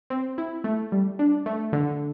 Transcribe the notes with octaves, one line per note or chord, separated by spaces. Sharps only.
C4
E4
A3
G3
D4
A3
D3